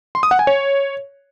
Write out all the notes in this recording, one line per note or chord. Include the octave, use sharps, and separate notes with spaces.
C6
D#6
F#5
G#5
C#5